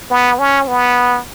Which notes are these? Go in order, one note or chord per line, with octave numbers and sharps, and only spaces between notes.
B3
C#4
B3